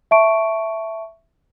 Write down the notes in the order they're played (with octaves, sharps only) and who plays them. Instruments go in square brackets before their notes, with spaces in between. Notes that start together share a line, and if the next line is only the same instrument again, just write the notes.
[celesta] E5 A5 C#6 D7